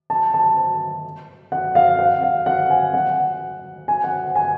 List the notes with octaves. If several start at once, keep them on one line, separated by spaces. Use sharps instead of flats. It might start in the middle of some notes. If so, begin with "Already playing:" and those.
A5
A5
F#5
F5
F#5
F5
F#5
G#5
F#5
G#5
F#5
G#5